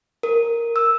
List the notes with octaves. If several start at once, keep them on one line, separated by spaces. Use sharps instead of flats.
A#4
E6